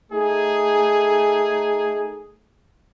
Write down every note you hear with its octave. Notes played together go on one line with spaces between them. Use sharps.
A3 D#4 G#4